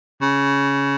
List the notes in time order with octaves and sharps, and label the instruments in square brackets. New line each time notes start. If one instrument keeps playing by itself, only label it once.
[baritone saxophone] C#3